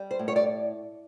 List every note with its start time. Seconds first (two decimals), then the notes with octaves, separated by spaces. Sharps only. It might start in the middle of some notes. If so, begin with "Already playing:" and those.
Already playing: G3
0.11 C5
0.19 A2
0.28 C#5
0.36 D5